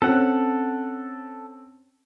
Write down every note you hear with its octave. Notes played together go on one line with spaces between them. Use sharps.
C4 C#4 A4 F#5